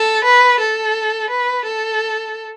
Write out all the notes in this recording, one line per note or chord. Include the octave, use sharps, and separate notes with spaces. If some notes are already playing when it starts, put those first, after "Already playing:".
Already playing: A4
B4
A4
B4
A4